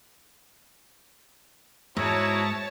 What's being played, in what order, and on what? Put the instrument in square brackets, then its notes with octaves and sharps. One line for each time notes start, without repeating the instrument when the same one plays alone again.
[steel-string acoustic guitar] G#2 [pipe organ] E4 F#4 [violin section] C#5 A5 [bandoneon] E5 A#5 D#6